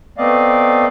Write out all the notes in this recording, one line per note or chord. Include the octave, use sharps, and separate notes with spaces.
A3 B3 C4 D5 D#5 F5